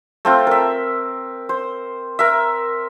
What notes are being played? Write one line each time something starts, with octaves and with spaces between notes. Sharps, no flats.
A3 C4 F4
A#4 E5
C5
A#4 E5